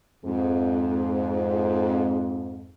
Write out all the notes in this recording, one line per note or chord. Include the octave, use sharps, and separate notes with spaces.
F2 G#2